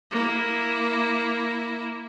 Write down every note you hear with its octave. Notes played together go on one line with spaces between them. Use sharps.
A#3 E4